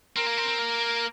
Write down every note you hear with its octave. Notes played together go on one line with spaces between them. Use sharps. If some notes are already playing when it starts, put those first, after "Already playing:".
C4 A#4
A#3
C4
C4
A#3